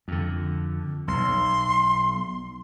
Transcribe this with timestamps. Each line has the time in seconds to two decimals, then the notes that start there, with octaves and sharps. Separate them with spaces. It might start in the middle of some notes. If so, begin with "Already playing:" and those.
0.08 F2 D3
1.08 B1 C6